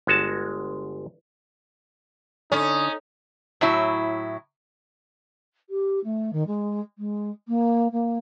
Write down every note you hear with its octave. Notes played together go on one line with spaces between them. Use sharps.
G1 G#3 F#4 A5
D3 C#4 D#4 D#6
A2 F#3 E4
G4
A3
D#3
G#3
G#3
A#3
A#3